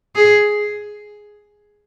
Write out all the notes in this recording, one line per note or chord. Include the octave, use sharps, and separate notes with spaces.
G#4